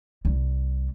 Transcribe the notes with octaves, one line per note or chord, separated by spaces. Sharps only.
C2 G3